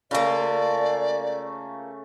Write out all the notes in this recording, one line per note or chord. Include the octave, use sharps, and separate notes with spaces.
C#3 A3 A#3 F4 D5